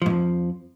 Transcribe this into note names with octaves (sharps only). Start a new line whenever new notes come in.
F2 G#2 F3